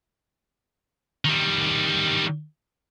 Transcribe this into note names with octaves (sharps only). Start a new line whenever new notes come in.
D#3 G3